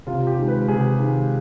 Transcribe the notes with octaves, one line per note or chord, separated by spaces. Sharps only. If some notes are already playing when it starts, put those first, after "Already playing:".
C3 F4
G4
D#3 G#3
B4
C3 G#4
D#3 G#3 G#4